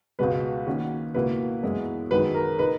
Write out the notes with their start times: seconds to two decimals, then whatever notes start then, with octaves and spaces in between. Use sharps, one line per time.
0.19 C#2 B2 G#3 B4
0.67 D#3 A#3 C#4 F#4
1.14 C#2 B2 A#3 E4 B4
1.63 F#2 E3 G#3 B3 E4
2.11 F#2 D#3 G#3 D#4 F#4 B4
2.35 A#4
2.58 A#2 A#3 D#4 B4